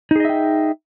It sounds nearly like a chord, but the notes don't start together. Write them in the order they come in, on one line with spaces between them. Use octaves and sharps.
D#4 G#4 D#5 E5 G5